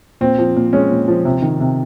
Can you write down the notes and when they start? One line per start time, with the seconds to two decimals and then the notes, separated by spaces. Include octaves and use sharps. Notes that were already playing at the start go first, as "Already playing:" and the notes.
0.21 A#2 C4
0.38 F3
0.56 A#2
0.73 G#3 C#4
0.91 A#2
1.08 F3
1.25 C3
1.42 D#3
1.60 C3